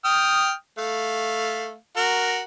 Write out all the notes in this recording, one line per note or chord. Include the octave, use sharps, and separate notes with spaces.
G5 D#6 F6
A3 F5
F#4 A#4